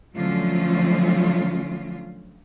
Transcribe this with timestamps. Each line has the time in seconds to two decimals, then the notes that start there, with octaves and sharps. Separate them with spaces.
0.16 D3 F3 F#3 A3 C#4 F4